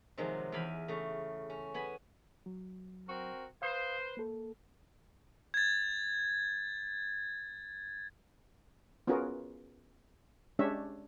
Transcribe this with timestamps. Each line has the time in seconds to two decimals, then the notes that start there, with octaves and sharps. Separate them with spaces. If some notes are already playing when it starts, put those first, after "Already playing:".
0.18 C3 D#3 F3 F#3 G#3
0.52 E2 F5 G5 G#5 B5
0.88 C#3 A3
1.50 C#4
1.74 B3 G#5 B5
2.46 F#3
3.07 C4 F#4 A#4
3.62 B4 C5 F5 D#6
4.17 A#3 A4
5.54 G#6 A6
9.07 B3 C#4 F4 F#4 G#4 A#4
10.59 G#3 C#4 D4 G4 C#5 E5